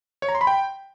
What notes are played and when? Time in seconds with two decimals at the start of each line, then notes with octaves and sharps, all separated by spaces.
0.22 C#5
0.29 A#5
0.35 C6
0.41 B5
0.47 G5